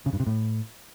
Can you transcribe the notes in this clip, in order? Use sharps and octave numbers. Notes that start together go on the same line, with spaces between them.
C#3
G2
C3
A2